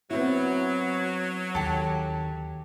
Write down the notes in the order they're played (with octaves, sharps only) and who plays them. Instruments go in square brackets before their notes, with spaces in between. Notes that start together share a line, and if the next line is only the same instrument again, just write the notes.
[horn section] F#3 [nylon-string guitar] B3 C4 E4
[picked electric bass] D#2 D#3 [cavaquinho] G4 A4